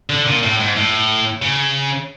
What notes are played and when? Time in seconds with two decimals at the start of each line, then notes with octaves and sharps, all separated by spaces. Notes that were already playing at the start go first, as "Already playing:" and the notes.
0.10 D3
0.26 A#2
0.43 A2
0.60 G#2
0.77 A2
1.42 C#3